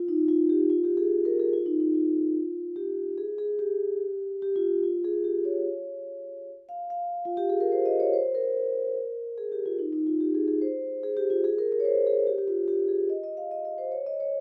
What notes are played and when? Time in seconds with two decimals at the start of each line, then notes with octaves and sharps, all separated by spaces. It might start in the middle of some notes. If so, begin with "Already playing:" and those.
Already playing: F4
0.08 D#4
0.29 F4
0.49 G4
0.70 F4
0.84 G4
0.97 G#4
1.25 A#4
1.39 G#4
1.53 F4
1.66 D#4
1.80 D#4
1.94 F4
2.76 G4
3.18 G#4
3.38 G#4
3.59 G4
4.42 G4
4.56 F4
4.83 F4
5.04 G#4
5.24 G4
5.45 C#5
6.69 F5
6.90 F5
7.25 F4
7.37 G4
7.49 G#4
7.60 A#4
7.72 C5
7.86 D#5
8.00 C#5
8.13 C5
8.35 A#4
9.38 G#4
9.52 G4
9.66 F4
9.79 D#4
9.93 D#4
10.07 F4
10.21 G4
10.35 G#4
10.48 G#4
10.62 C5
11.03 G#4
11.17 G4
11.30 F4
11.44 G#4
11.58 A#4
11.72 A#4
11.80 C#5
11.85 C5
12.06 G#4
12.27 G4
12.38 G4
12.48 F4
12.68 G4
12.88 G#4
13.10 D#5
13.24 D#5
13.37 F5
13.51 D#5
13.65 D#5
13.78 C5
13.92 C#5
14.06 D#5
14.20 C#5